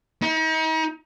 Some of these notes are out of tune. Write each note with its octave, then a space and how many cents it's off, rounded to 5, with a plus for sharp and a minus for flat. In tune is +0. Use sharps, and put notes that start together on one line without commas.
D#4 +40